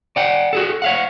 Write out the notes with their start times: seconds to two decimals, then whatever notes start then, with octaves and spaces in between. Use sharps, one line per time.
0.16 D5 F#5 G5
0.53 F#4 G#4 A4
0.82 C#5 F5 F#5